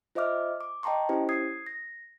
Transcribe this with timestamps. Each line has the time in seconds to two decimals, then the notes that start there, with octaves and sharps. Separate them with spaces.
0.15 F4 C5 D#5 E5 D6 F6
0.61 D6
0.83 D#5 G5 A5 A#5 C6 C#6
1.09 C#4 E4 G4 C5
1.29 D#6 G#6 C7
1.67 A#6